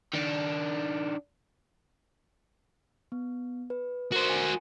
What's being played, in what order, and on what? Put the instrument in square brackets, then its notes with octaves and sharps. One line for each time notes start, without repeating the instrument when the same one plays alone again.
[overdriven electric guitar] D#3 D4
[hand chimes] B3
B4
[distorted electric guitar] F#4 C5 [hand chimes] A#4
[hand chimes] G#5